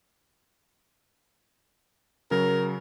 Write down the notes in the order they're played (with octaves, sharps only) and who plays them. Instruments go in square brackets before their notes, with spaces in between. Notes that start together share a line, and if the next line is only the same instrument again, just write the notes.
[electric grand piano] C#3 F#3 [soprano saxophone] A#4